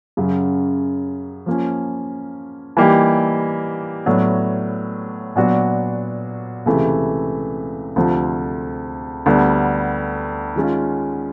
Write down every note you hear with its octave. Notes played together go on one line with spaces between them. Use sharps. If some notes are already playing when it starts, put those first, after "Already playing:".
F#2 C#3 F#3
F3 A#3 C#4
E3 G3 A#3 D#4 G4
A2 F#3 B3 D4
A#2 F#3 B3 D4 F#4
C#2 C3 E3 A3
D2 C3 F3 A3 C4
D2 D3 G3 B3
D#3 G#3 C#4 F4